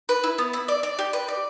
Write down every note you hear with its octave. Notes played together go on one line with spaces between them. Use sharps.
B4
E4
B3
E4
D5
D5
G4
B4
D5